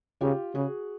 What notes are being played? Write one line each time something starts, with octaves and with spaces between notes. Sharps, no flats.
C#3 F4 G4
C#3 F#4 G#4